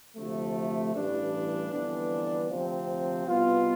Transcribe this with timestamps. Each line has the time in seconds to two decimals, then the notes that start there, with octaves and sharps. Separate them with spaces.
0.16 D2 C3 F3 A3
0.94 A1 G2 E3 G3 D4
1.71 G1 F2 E3 B3 D4
2.48 D2 C3 F3 C4
3.25 C2 B2 B3 F4